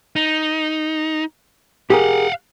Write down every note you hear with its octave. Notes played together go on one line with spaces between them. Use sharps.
D#4
G4 G#4 A#4 F5 F#5